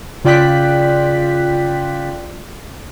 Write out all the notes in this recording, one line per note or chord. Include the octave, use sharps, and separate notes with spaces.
C#3 F4 D5 G5 F#6 B6